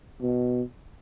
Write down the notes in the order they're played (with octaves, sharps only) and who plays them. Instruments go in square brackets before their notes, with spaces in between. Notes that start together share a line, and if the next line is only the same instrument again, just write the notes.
[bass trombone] B2